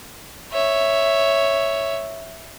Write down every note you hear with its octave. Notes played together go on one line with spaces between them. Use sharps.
C#5 E5